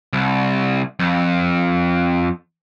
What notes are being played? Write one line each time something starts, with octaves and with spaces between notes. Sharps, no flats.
C2
F2